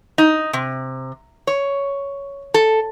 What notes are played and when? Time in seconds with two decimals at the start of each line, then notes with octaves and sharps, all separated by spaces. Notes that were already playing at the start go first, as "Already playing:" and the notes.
0.18 D#4
0.53 C3
1.47 C#5
2.54 A4